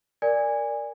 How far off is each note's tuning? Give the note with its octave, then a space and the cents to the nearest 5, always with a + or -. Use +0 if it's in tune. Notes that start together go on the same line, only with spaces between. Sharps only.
A#4 +0 D5 +0 G#5 -20